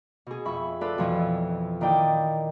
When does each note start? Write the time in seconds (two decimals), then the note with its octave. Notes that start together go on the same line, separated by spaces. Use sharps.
0.27 B2 G#4
0.46 F2 E5 B5 C#6
0.81 F4 A4 B4 D5
0.98 F2 B2 E3 F3
1.81 A#2 D#3 E4 D5 G5 D#6